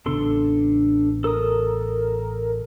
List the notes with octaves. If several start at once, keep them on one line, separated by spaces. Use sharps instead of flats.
A1 C#3 B3 D4 A4 C6
A4 A#4 D#6